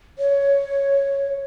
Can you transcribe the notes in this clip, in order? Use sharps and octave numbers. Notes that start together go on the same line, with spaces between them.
C#5